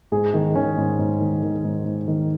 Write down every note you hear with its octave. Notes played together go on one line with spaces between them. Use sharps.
G#2 G#4
D#3
D#3 C#4
G#2
G#2
D#3
D#3
G#2
G#2
D#3